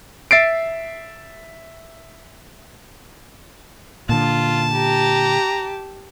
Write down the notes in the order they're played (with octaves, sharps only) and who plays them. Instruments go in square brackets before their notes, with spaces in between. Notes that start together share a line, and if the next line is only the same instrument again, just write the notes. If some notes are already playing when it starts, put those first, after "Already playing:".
[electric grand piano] E5 A6 C7 D7
[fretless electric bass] A#2 D3 [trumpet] F4 [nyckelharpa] A5
[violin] G4 [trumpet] A#5